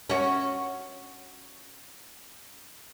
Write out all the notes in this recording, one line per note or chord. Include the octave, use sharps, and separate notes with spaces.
C#4 F#4